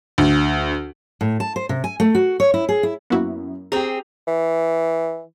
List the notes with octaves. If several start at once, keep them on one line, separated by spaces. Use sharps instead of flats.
D2
A2
A5
C5
C3
G#5
A3
F#4
C#5
E4
G#4
E4
F#2 A#3 B3 E4 F#4
C4 G4 G#4 A#5 F7
E3